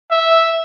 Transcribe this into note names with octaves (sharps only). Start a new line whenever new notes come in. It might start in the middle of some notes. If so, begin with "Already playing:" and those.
E5